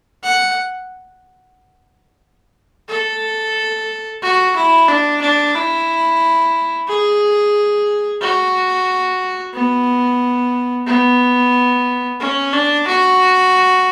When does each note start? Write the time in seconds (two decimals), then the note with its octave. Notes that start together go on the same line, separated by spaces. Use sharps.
0.23 F#5
2.89 A4
4.22 F#4
4.56 E4
4.88 D4
5.21 D4
5.55 E4
6.88 G#4
8.21 F#4
9.54 B3
10.87 B3
12.20 C#4
12.53 D4
12.87 F#4